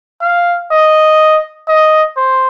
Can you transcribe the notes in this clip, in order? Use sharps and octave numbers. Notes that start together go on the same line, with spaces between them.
F5
D#5
D#5
C5